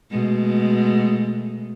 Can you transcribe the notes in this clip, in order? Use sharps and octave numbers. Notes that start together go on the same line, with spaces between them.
B2 G#3 A3